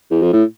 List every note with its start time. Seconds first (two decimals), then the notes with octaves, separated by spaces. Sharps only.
0.11 E2
0.22 F2
0.33 A2